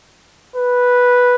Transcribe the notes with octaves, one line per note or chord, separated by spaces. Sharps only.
B4